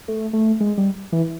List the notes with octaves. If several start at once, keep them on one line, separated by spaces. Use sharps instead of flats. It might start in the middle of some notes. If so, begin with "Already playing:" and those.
A3
A3
G#3
G3
E3